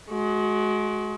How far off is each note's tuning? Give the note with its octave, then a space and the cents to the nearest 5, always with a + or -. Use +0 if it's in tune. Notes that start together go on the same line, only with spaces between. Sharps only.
G#3 +30 F#4 +0